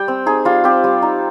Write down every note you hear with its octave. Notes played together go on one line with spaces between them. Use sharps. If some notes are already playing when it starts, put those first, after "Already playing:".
Already playing: G3 G5
C4
D#4 G#4
G3 F4
C4 G4
G3
D#4